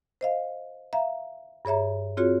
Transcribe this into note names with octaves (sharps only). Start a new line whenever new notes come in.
C5 D#5 F5
E5 F5 A#5
G2 G#4 C#5 E5 A#5
C4 F4 F#4 G#4 C#5